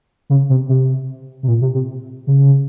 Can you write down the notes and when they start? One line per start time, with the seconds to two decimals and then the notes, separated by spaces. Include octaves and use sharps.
0.30 C#3
0.49 C3
0.69 C3
1.43 C3
1.48 A#2
1.61 C3
1.74 C3
2.27 C#3